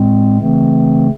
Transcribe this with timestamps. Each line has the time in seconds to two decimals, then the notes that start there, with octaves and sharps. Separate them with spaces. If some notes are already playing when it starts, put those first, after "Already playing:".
Already playing: A2 G#3 C4
0.40 C#3 E3 A3 C4